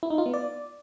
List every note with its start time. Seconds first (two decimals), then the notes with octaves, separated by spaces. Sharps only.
0.03 E4
0.10 D#4
0.18 F4
0.26 B3
0.34 D5